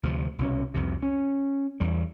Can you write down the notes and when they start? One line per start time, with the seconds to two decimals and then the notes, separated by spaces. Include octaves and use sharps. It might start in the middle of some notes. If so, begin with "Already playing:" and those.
0.03 D2 C3 F3
0.39 C2 B2 C#4
0.74 C2 F2 C3
1.02 C#4
1.80 E2 G3